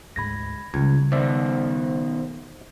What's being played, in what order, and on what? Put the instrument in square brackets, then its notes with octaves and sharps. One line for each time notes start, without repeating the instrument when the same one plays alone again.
[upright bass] D2 G#2 [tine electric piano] B5 G#6 A#6
[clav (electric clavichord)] C#2 [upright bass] C#3 G3 [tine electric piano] G#6
[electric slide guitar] B2 D#3 [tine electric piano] C5 [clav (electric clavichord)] D5 E5